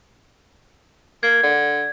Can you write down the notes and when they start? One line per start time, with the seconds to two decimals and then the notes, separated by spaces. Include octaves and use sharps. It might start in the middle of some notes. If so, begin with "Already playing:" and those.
1.23 A#3 G#6
1.43 D3